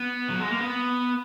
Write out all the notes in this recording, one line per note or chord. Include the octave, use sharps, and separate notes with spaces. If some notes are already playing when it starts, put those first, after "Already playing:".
Already playing: B3
F#3
G#3
A#3
B3